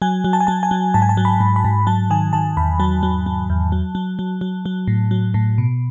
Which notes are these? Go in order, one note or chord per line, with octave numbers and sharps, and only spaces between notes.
F#3 G#5
F#3
A5
G#5
F#3 A5
G#5
F#3
G#2 A5
G#5
A5
F#3
B5
G#2
B5
G#2
F#3 A5
D#3 G#5
D#3 A5
E2 B5
F#3 A5
F#3
F#3
E2
F#3
F#3
F#3
F#3
F#3
A2
F#3
A2
B2